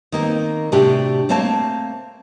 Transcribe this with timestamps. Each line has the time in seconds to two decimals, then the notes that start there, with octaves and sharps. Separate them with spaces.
0.12 D#3 A#3 C4
0.72 A2 C3 D4 F#4 G4
1.29 A3 A#3 C4 C#5 A5